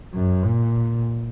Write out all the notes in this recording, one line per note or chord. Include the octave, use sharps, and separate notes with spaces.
F#2
A#2